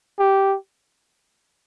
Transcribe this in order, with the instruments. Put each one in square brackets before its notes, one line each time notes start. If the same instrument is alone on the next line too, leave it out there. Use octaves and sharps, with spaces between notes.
[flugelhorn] G4